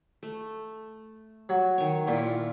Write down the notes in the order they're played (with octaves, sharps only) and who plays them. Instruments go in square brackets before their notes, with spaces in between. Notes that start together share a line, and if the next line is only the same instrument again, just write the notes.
[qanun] A3
[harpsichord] F#3
[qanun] D#3 C#5
[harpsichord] A#2 [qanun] E4 F4